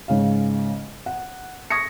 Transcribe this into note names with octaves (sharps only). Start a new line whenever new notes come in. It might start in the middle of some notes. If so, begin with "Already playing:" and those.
G#2 C#3 F5
F#5
C#6 D#6 G#6 A#6 C#7